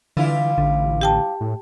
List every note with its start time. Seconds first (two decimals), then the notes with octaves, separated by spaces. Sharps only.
0.17 D3 E3 G3 E4 F4
0.58 A1 D3
1.01 G4 G5 A5
1.40 A2